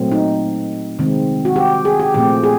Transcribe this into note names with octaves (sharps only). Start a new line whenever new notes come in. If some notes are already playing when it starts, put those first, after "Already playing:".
Already playing: A#2 F#3 A3 C4
D#4
C3 D#3 G#3 C4
F#4
G4
G#4
G4
A#2 F3 A3 C4 G4
G#4